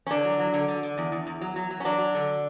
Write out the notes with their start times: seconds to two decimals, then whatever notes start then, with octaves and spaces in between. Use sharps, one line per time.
0.07 C#4
0.11 D3 D4
0.25 F#3
0.39 F#3
0.54 D3
0.68 D3
0.83 D3
0.98 E2
1.12 E2
1.27 E2
1.41 F#3
1.56 F#3
1.71 F#3
1.80 C#4
1.85 F#3 D4
1.99 F#3
2.15 D3